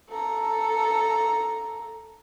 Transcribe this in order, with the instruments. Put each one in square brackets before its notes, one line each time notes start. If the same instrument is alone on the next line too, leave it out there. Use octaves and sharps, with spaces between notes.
[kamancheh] A4 A#5